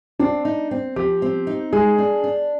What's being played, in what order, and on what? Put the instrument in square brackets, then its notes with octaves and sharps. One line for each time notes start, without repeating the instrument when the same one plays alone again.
[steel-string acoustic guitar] C4 [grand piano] D4
[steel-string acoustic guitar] D#4
C4
[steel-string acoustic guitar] F3 [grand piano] G4
[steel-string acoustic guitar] C4
D#4
[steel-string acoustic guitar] G#3 [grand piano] G#4
[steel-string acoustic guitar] D4
D4